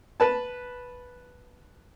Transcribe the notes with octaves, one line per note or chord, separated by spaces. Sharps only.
B4 A5